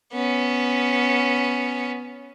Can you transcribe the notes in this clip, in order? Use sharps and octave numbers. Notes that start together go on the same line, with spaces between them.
B3 C#4